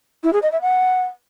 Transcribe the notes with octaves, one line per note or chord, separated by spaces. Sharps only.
E4
G#4
D#5
E5
F#5